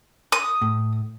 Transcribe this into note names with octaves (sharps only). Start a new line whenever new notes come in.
D#6
A2